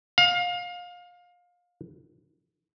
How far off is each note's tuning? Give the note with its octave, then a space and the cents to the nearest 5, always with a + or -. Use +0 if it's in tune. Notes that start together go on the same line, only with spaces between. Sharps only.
F5 +25